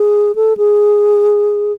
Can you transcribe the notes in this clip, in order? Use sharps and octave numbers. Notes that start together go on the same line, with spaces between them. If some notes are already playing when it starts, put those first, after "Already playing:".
Already playing: G#4
A4
G#4